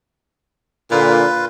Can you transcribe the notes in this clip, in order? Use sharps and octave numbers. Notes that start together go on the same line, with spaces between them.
A#2 D3 F4 B4